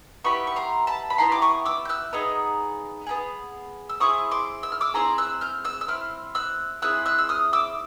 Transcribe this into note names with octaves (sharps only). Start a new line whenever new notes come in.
B3 E4 G4 B5 C#6
C#6
A#5 C6
A5 B5
B5
B3 E4 G4 A#5 C6
D6
C#6 D#6
D6 E6
G6
E6 F#6
B3 D#4 G#4
B3 D#4 G#4
E6
C4 E4 G#4 C#6 D#6
C6 D6
E6
F6
D6 E6
C4 E4 G#4 A#5 C6
E6 F#6
F6 G6
E6 F#6
E6
C4 E4 F6
E6 F#6
C4 E4 G#4 E6 F#6
E6 F#6
E6
D#6 F6
D6 E6